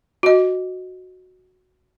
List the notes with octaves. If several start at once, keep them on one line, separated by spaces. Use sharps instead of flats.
F#4 D#5